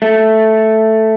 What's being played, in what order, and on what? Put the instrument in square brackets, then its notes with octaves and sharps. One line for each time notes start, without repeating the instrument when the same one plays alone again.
[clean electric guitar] A3